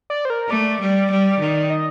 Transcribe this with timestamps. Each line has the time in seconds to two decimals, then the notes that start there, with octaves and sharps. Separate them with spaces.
0.10 D5
0.25 C5
0.30 A#4
0.49 A3 D5
0.80 G3
1.10 G3
1.39 D#3
1.70 D#5